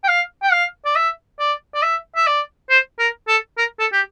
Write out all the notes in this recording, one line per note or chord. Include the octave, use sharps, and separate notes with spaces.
G5
F5
G5
F5
D5
E5
D5
D5
E5
E5
D5
C5
A#4
A4
A#4
A4
G4